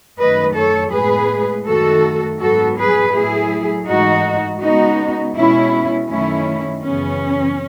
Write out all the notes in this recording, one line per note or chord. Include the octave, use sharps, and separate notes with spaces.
F#2 D#3 A3 B4 D#5
A4 C#5
A2 G#3 B3 G#4 B4
F#2 D#3 A3 F#4 A4
G#2 F#3 B3 F#4 A4
G#4 B4
A2 F#3 A3 E4 G#4
G#2 E3 A3 D#4 F#4
C#3 G#3 B3 D#4 F#4
B2 G#3 B3 C#4 E4
F#2 D#3 A3 C#4 E4
F#2 C#3 E3 B3 C#4